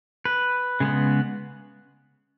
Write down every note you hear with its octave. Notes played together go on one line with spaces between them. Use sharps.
B4
C#3 G#3 B3